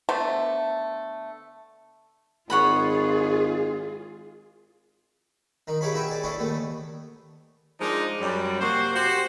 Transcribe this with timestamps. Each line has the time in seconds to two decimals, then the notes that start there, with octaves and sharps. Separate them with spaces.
0.09 D3 A3 B3 C5
2.50 G#1 F4 G#4 C#5 F#5 B5
5.67 D#3 D#4
5.81 E4 G4 G#4 C#5 F5 B5
5.93 D#4 E4 F#4 B4 E5 G5
6.07 G#4 D5
6.23 B3 C#4 D4 E4 A4
6.38 D#2 A3 B3
7.80 F3 G#3 D4 D#4 A#4
8.19 F#2 G3
8.59 C3 A#3 F#4 C5
8.94 F#4 G4 C5